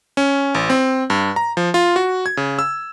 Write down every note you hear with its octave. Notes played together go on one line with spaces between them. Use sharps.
C#4
A1
C4
G2
A#5
F3
F4
F#4
G#6
C#3
E6